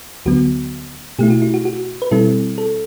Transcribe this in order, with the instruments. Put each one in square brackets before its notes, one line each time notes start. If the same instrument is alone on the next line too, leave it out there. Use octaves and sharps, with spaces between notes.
[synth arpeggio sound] D2 D3 F#3 B3 F#4
B2 A3 E4 G4
F#4
E4
F#4
F#4
B4
B2 G3 C4 E4 A4
A4